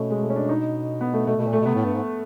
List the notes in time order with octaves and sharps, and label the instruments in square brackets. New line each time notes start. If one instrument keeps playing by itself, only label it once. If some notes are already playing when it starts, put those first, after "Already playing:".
Already playing: [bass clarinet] B2 [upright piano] A3 C#4
[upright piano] G#3
A3
C#4
D4
D#4
B3
A3
[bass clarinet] B2 [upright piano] A3
[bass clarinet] B2 [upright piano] A3
[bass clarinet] A#2
[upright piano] A3
[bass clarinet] B2
[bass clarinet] C3 [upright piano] B3
[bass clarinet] A2
G2
G#2